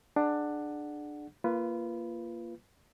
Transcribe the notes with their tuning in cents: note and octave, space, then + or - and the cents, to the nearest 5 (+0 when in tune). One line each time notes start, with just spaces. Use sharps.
D4 +15 G#4 +30 F#5 +0
A#3 +0 F4 -25 B4 +0